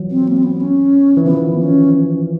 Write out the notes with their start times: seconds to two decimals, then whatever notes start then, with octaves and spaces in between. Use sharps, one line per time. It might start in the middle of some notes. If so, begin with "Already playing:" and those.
Already playing: E3 F#3
0.10 C4
0.27 A#3
0.37 C4
0.43 B3
0.60 C#4
1.17 E3
1.25 D#3 F3 B3
1.60 C#4